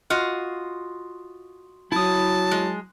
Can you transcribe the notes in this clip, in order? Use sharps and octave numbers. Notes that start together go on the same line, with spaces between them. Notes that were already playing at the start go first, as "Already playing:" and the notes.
F4 F#4 D#5
F#3 E4 A5 D#6
G#3